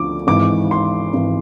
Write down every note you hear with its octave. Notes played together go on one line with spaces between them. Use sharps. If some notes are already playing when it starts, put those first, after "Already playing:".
Already playing: D2 D3 F3 D6
G#1 G#2 E3 D6
C6
G#1 G#2 E3